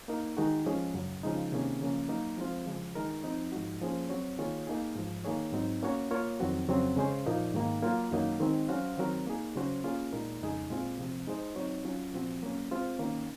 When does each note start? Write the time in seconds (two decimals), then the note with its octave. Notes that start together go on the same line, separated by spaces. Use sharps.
0.08 A#3 D#4 A#4
0.37 D#3 G#3 D#4 F#4
0.66 F3 G#3 C#4 G#4
0.94 F#2 C#3 F#3
1.23 C#3 F3 G#3 D#4
1.52 C3 D#3 A#3 C#4 G#4
1.81 C#3 F3 A#3 C#4
2.09 F#3 A#3 D#4 A#4
2.37 F3 G#3 C4 F4 C5
2.66 C#3 F3 G#3
2.95 D#3 G#3 D#4 A#4
3.24 F3 C4 D#4
3.52 G#2 F3 G#3 D#4 F#4
3.82 F3 A#3 C#4 G#4 C5
4.10 F#3 C4 F#4 C#5
4.39 D#3 A#3 F4 G#4 C#5
4.67 A#3 D#4 G#4
4.96 G#2 F3 G#3
5.25 D#3 A#3 D#4 G#4 C#5
5.53 G#2 F#3 C4 D#4
5.83 A#3 C#4 F#4 C#5
6.11 A#3 F4 A#4 C#5
6.40 F2 D#3 F#3 C4 F#4
6.68 F2 C#3 F#3 C4
6.96 C#3 G#3 C#4 G#4 C5
7.26 A#2 F3 A#3 D#4
7.54 G#2 D#3 A#3
7.83 F#3 A#3 F4
8.11 F#2 D#3 F#3 A#3 D#4
8.40 D#3 G#3 C4
8.68 F#3 C#4 F#4 C5 F5
8.97 D#3 F#3 C4 F#4 A#4
9.27 A#3 D#4 G#4
9.55 C#3 F#3 C#4 F#4 C5
9.84 A#3 C#4 F4 G#4
10.12 A#2 G#3 D#4 A#4
10.41 F2 C#3 G#3 D#4 G#4
10.70 A#2 G#3 C4 F4 G#4
10.98 C3 F3 C4
11.27 G#3 D#4 G#4 C5 D#5
11.56 F#3 C4 D#4 F#4 C#5
11.84 F#3 C#4 F4
12.13 A#2 F3 C4 F#4
12.42 F#3 A#3 C#4
12.71 G#3 C4 F4 C5
12.99 D#3 A#3 C#4